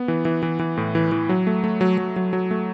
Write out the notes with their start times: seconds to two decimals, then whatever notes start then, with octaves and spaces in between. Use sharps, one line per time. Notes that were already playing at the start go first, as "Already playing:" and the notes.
Already playing: B3
0.08 E3
0.25 E3
0.43 E3
0.59 E3
0.77 A2
0.95 E3
1.12 E3
1.29 F#3
1.47 A3
1.64 A3
1.81 F#3
1.98 F#3
2.16 F#3
2.33 F#3
2.51 A3